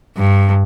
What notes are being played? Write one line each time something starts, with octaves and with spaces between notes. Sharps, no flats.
G2